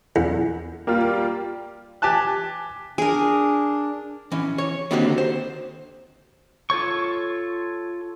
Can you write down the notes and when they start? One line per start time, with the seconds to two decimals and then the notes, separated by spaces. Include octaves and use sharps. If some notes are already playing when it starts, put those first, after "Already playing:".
0.16 E2
0.87 G3 A#3 F4
2.02 G4 G#5 A5 F#6
2.98 D4 G#4 A#4
4.32 E3 C#4
4.58 C#5
4.91 D3 D#3 A#3 C4 F#4 G4
5.18 C5
6.70 F4 A4 C#5 C#6